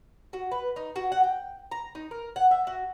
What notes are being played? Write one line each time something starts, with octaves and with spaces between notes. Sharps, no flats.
F#4
B4
D#4
F#4
F#5
G5
A#5
D#4
A#4
F#5
E5
F#4